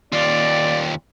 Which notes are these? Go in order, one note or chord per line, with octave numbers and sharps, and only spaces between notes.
D#2 F4 D5